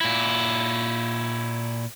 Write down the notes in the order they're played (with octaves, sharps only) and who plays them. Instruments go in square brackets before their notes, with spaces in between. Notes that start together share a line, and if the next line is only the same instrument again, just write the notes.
[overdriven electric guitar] A#2 E4